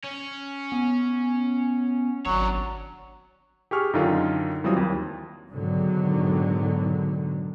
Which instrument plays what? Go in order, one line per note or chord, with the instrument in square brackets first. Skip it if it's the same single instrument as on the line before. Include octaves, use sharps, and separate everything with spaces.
[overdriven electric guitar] C#4
[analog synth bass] B3
[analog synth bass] G#1 [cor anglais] F#3 [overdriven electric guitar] D4 C#5
[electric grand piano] G4 G#4 C#6 F6
F#2 D3 D#3 D#4 F4
E3 F#3 G3 C4 F4 D#6
D#2
[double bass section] G#2 B2 D3 D#3 F#3